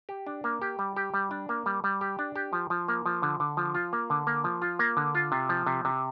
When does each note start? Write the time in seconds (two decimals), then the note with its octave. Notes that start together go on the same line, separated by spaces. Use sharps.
0.09 G4
0.27 D4
0.44 A#3
0.62 G4
0.79 G3
0.96 G4
1.14 G3
1.31 D4
1.49 A#3
1.66 G3
1.84 G3
2.01 G4
2.19 D4
2.36 G4
2.53 F3
2.70 F3
2.88 A#3
3.06 F3
3.22 D3
3.40 D3
3.57 F3
3.75 F4
3.93 A#3
4.10 D3
4.27 A#3
4.44 F3
4.62 F4
4.79 A#3
4.97 D3
5.15 F4
5.32 C3
5.49 F3
5.67 C3
5.85 C3